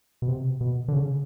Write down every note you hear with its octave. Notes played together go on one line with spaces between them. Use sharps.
B2
C3
B2
D3
C#3